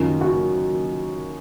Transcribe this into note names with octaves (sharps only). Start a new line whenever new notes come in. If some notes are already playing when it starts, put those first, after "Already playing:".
Already playing: F#2 D#3 F4
F#4